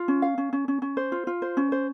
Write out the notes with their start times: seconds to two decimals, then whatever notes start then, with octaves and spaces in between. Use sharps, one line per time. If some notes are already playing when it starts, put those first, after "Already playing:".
Already playing: F4
0.08 C#4
0.22 F5
0.38 C#4
0.53 C#4
0.68 C#4
0.82 C#4
0.97 C5
1.12 F4
1.27 F4
1.42 C5
1.57 C#4
1.72 C5